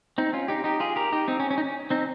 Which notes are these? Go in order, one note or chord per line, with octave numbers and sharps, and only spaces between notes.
C4 D#4
C#4 F4
D#4 G4
D#4 G4
F4 G#4
G4 A#4
D#4 G4
C4 D#4
C#4
C#4
D#4
C#4
C4 D#4